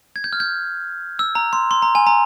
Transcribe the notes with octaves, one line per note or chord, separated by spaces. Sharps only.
G#6
G6
F6
G6
E6
A#5
C6
C6
A#5
G#5
A#5